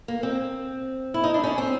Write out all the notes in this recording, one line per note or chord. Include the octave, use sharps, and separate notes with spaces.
A#3
C4
E4
D#4
D4
C#4
C4